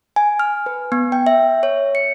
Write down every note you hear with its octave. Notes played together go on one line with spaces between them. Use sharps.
G#5
F6
B4
B3
G5
E5
C#5
C#7